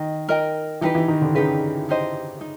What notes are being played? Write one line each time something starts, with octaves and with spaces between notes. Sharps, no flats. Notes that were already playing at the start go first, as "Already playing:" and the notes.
Already playing: D#3 D#5
A#4 D#5 G5
E3 D#4 G4 B4
E3
D#3
D3
C#3 D#4 G4 B4
D#4 G4 C5 D#5
D#4